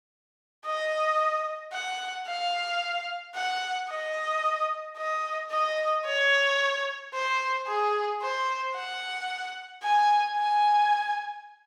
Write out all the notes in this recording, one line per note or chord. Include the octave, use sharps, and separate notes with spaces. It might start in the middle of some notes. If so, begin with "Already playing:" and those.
D#5
F#5
F5
F#5
D#5
D#5
D#5
C#5
C5
G#4
C5
F#5
G#5
G#5